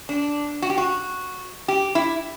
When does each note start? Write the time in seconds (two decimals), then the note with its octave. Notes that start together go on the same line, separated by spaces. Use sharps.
0.09 D4
0.62 F#4
0.70 G4
0.78 F#4
1.68 G4
1.95 E4